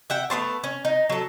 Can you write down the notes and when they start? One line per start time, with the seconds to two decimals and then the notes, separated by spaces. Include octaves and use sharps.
0.10 E5 F#5 G5
0.30 A3 B3 C5 A5
0.64 C#4
0.85 D#4
1.10 F#3 A4